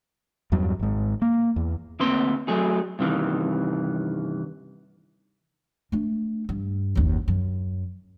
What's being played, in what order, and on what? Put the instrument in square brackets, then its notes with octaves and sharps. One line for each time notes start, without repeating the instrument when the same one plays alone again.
[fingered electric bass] E2 G2 F#3
G#1 G#2
A#3
E2
[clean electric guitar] D2 A#3 C4 B4 C6
F#3 A3 G#4
G2 C3 D#3 E3
[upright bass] A3 D4
G2
F#1 D#2
F#2